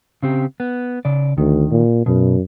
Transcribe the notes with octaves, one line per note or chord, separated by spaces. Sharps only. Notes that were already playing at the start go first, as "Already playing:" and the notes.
C#3 C4 G4
B3
C#3 D5
D2 D#3
A#2
F#2 B2